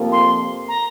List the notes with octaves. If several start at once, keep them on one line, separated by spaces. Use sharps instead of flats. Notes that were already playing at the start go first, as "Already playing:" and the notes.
Already playing: F2 C3 F3 A#3
C6
A#5